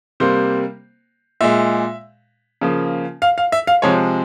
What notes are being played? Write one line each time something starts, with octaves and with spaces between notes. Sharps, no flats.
C3 G3 A#3 C5
A#2 G#3 E5
C#3 F3 A#3
F5
F5
E5
F5
C3 F3 G#3 C#5